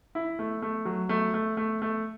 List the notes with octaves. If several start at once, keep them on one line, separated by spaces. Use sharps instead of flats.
E4
A3
A3
F#3
A3
A3
A3
A3